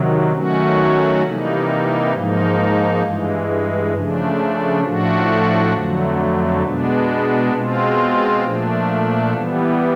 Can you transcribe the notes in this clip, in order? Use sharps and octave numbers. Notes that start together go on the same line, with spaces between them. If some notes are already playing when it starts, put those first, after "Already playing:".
Already playing: C3 D#3 F#3
D#3 F#3 A3 C#4 F#4
C3 E3 G3 A#3 D#4
G#2 F3 A#3 D#4
G2 E3 G#3
C#3 F3 A3 D4
A2 F3 A3 D4 F#4
F2 D3 F#3 A3
B2 G#3 B3 D4
B2 G#3 C4 F4
A#2 F3 A3 D4
E3 G3 B3